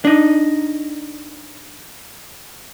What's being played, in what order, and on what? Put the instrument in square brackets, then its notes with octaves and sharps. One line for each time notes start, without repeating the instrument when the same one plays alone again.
[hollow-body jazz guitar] D4 D#4